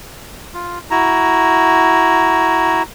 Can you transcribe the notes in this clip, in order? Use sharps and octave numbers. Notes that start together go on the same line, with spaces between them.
F4
E4 F#4 A#5